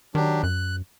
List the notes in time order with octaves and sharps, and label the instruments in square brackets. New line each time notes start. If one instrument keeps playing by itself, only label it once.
[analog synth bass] D#3 [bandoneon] F#3 D4 G4
[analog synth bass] F#2 [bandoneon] F#6